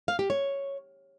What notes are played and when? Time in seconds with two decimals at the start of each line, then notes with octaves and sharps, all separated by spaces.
0.08 F5
0.19 G4
0.30 C#5